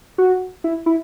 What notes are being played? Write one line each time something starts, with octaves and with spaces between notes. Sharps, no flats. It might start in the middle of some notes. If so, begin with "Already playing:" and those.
F#4
E4
E4